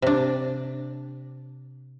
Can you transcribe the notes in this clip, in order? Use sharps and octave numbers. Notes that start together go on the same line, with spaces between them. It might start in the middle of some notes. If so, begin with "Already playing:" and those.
C3 D4